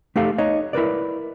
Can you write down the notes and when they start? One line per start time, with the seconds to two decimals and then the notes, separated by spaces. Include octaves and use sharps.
0.16 A3 D#4 G4 A4 F5
0.38 D#4 C#5 D#5
0.73 E4 A#4 B4 D5